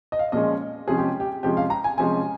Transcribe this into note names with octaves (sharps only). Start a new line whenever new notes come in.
D#5
F5
A#2 F3 G#3 C#4 D#5
C3 F3 G#3 C#4 G#4
G4
G4
C3 F3 G#3 C#4 G4
F5
A#5
G#5
C3 F3 G#3 C#4 G#5